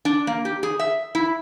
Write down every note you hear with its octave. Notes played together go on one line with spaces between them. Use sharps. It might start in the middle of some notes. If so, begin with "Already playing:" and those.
D4
A#3
G4
G#4
E5
E4